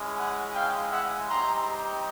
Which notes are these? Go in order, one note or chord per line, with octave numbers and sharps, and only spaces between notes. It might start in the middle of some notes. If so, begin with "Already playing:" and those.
Already playing: G#3 C#4 E4
F#5 G#5
F5 G5
E5 F#5
G3 C4 D#4 G4 A#5 C6